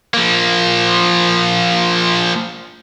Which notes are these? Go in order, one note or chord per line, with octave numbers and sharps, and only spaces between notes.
F3 A#3